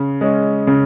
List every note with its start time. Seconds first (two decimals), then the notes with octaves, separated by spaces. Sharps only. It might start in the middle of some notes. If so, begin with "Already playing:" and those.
Already playing: C#3
0.21 G#3 C#4
0.67 C#3